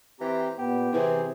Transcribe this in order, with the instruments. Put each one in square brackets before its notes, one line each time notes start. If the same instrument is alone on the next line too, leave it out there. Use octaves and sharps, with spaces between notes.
[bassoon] E3 [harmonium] C4 G4 A#5
[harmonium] A#2 [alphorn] B3 [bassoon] G4
[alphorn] C3 [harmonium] E3 C4 G#4 [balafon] E4 B4